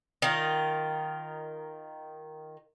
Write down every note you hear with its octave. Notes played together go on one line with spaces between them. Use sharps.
D#3 F4